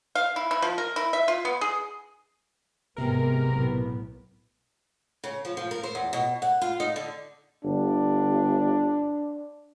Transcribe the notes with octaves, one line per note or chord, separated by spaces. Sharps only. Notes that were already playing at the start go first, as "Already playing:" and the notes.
F5
E4
E4
F3
A#4
E4
E5
F4
B3
G#4
G#1 C3 G#3 B3 A#4
B1 A2 B3
C#3
F3
F3
A#4
C5
E2
B2
F#5
F4
D#4
D3
G1 D4